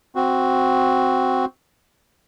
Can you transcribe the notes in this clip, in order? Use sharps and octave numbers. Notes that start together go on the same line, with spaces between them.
C4 F#4